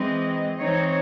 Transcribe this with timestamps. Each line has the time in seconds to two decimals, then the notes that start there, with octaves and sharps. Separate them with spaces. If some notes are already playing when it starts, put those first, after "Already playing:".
Already playing: E3 G#3 C4 D#5
0.58 E3 C4 D#4 C#5